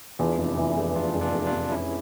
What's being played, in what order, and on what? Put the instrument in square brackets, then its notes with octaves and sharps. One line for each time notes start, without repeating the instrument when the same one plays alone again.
[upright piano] E2 [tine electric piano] D4 F4
[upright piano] F1
E3
F1
[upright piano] F1 [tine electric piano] D4 F4
[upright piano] F1
[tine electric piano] D4 F4
[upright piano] F1
[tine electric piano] G4
D4 F4
[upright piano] F1
[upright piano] F1 [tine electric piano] C#4 E4